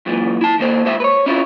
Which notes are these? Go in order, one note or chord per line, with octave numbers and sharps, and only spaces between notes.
F#2 A#2 D#3 E3
E4 A5
D#3 A#3 C5
G#2 C5 E5
B4 C#5
C#4 E4 F4